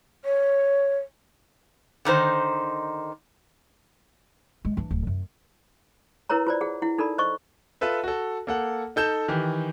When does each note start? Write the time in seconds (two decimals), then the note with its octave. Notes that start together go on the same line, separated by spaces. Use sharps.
0.25 C#5
2.05 D3 D#3 D#4 C5
4.65 G#3
4.77 E3 D4
4.91 D1
5.07 F#2
6.29 E4 A#4 B4 C#5 A#5
6.47 F4 C5 D5
6.61 G#4 F#5
6.82 E4 F#5
6.98 D#4 A4 A#4 D5 B5
7.18 C5 D#5 C#6
7.81 F4 A4 B4 E5
8.04 F#4 A4
8.47 A#3 A4 F#5
8.96 D#4 A4 G6 E7
9.28 D#3 E3 G4